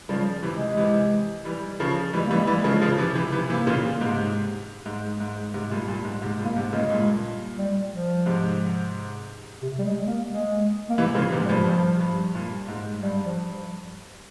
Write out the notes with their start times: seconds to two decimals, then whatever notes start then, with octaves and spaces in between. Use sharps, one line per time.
0.09 C#3 F3 G3
0.43 C3 E3
0.55 G#3
0.77 C3 E3
1.45 E3 G3
1.80 C#3 F3
2.13 E3 G3 G#3
2.26 E3 G3 A#3
2.37 G#3
2.47 E3 G3
2.64 C#3 F3
2.82 C#3 F3
2.98 C3 E3
3.15 C3 E3
3.32 C3 E3
3.49 C3 E3 A#3
3.67 A#2 C#3
4.01 G#2 C3
4.86 G#2
5.20 G#2
5.54 G#2 C3
5.71 G2 A#2
5.88 G2 A#2
6.05 G#2
6.22 G#2 C3
6.39 G2 A#2
6.45 A#3
6.56 G#2 C3
6.67 G#3
6.73 A#2 C#3
6.89 G2 A#2
7.58 G3
7.92 F3
8.26 G#2 C3
9.62 C3
9.79 G3
9.84 G#3
10.07 A#3
10.31 G#3
10.90 A#3
10.98 C3 E3 G#3
11.15 A#2 C#3 F3
11.32 G#2 C3 E3
11.45 G3
11.49 G2 A#2 F3
11.66 G2
12.00 G2
12.35 G2 A#2
12.68 G#2
13.03 G2 G3
13.25 F3